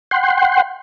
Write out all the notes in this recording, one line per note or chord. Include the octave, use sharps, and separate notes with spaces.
F#5 G5 C6